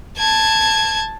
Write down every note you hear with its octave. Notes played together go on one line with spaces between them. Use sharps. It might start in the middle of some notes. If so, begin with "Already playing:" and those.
A5 G#6